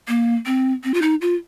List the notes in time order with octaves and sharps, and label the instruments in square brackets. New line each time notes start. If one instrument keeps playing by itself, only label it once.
[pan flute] A#3
C4
C4
F4
D#4
F4